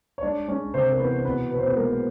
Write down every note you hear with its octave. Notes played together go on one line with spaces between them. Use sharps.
C#5
G#3 D4 D5
G#3 C#4 C#5
C3 C4 C5
A#4
E3 B3 B4
B2 B3 B4
B2 B4
C5
B3 B4
G#3 A#3 A#4